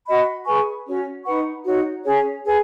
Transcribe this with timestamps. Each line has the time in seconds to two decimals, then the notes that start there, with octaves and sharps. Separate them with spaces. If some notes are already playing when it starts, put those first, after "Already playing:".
0.07 F#4 D#5 B5
0.46 G#4 B4 G#5 C#6
0.86 C#4 F#4 C#5
1.25 D#4 B4 F#5 C#6
1.66 D#4 F#4 C#5
2.04 C#4 G#4 C#5 G#5
2.45 G#4 B4 G#5